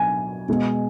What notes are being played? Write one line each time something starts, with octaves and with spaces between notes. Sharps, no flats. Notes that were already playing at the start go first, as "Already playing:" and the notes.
Already playing: B2 F#3 G#5
B2 G#3